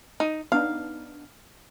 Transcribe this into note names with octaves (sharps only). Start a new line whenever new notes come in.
D#4
B3 D4 D#4 F5